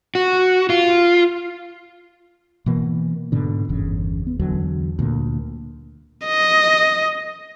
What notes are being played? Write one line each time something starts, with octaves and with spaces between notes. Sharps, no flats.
F#4
F4
B2 E3 A#3
G#2 B2 D3
G1 E2 C#3
B3
E2 D3 F#3
D2 A#2 F#3 A#3
D#5